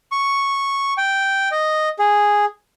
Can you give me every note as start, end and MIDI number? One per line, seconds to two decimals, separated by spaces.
0.12 0.94 85
0.98 1.49 79
1.52 1.89 75
1.99 2.45 68